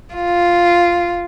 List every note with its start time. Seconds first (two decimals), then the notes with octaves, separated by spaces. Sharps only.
0.14 F4